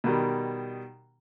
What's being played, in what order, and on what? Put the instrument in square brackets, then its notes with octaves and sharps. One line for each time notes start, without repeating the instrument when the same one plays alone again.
[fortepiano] B2 D#3 G3